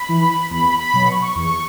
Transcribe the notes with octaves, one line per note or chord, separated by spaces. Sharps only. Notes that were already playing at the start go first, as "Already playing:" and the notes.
Already playing: B5
E3
E2 B5
B5
B2 F#3
C#6
C#6
E2 C#6